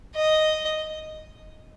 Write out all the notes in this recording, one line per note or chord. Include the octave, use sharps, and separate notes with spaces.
D#5